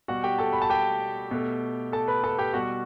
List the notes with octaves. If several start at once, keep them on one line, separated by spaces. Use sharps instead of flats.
B2 G3 F#4 F#5
G4 G5
A4 A5
B5
A5
G4 G5
B2 A3
A4 A5
B4 B5
A4 A5
G4 G5
B2 G3 F#4 F#5